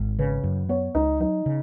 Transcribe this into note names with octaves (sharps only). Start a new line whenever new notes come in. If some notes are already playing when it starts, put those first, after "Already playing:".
Already playing: G#1
C#3 B4
F#2
B3 C#5
C#2 D#4
F#3 D#4
C#3